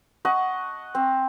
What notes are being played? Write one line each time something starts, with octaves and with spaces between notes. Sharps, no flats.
D#5 F#5 A5 C#6
C4